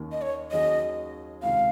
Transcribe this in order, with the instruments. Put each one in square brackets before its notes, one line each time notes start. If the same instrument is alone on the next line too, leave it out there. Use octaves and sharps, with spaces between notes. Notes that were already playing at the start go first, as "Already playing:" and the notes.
Already playing: [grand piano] D#2 D#3 A#3 C#4
[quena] D#5
C#5
[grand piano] D#2 D#3 F#3 C#4 G#4 [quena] D#5
[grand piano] C#2 C3 D#3 [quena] F5